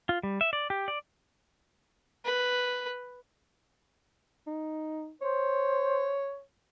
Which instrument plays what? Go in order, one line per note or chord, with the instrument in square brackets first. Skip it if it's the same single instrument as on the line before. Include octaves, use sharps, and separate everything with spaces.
[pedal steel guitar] F4
G3
E5
D5
G4
D5
[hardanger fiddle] B4
[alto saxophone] D#4
[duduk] C5 [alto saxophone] C#5